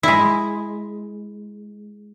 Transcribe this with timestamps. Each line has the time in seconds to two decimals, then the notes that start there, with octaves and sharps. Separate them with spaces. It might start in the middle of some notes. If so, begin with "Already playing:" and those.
0.03 G#3 E4